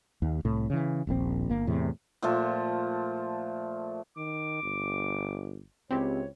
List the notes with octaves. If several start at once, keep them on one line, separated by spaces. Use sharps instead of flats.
D#2
C2 A2
C#3 E3
D#1 A#1 C3 C4
G1 A#3
E2 A2 C3
A#2 F3 A3 A4
D#3 D6
G1
C#2 C4 E4 G4 C#5